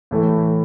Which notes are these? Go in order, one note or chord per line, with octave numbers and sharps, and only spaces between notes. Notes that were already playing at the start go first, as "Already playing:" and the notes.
A2 E3 A3 E4